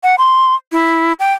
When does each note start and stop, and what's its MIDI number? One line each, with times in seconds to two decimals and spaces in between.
0.03 0.16 78
0.18 0.55 84
0.72 1.13 64
1.20 1.34 79